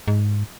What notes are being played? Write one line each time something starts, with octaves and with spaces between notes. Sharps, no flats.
G#2